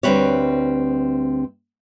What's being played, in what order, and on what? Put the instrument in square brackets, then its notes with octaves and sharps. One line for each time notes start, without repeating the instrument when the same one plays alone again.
[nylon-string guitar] D2 G3 C4 B4 C#5